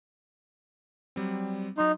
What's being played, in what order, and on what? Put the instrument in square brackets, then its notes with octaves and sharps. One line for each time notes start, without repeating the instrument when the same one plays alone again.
[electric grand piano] F#3 G3 C4
[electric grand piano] F#3 D#5 C6 [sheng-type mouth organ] D#4